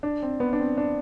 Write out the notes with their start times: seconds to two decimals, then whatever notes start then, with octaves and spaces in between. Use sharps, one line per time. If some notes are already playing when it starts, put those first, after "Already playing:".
0.03 D4
0.22 C4
0.40 B3
0.53 D4
0.59 C4
0.77 D4